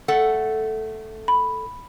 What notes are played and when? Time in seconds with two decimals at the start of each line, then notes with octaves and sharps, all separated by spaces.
0.08 A3 A4 F#5
1.28 B5